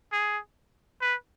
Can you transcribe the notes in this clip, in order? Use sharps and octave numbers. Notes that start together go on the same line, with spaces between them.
G#4
B4